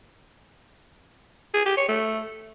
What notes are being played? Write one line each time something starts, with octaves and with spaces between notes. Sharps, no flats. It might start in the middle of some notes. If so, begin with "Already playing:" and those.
G#4
G4
C#5
A3